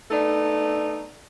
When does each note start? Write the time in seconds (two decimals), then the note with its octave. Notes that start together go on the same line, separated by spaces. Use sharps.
0.10 A3 B3 D4 D#4 A4